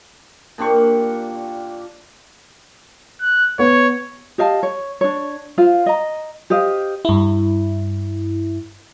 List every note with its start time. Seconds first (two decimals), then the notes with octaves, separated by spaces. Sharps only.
0.58 A#2 D4 G4 C#6
3.21 F#6
3.59 B3 C#5
4.38 G4 D#5 F5 A5
4.63 C#5
5.01 D4 C#5
5.58 F4 C5 F5
5.86 D#5 A#5
6.50 G4 C5 D#5 F5
7.05 G2 E4